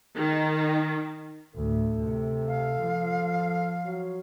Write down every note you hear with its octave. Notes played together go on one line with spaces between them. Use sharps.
D#3
D2 A2 A4
C3
F5
F3
F#3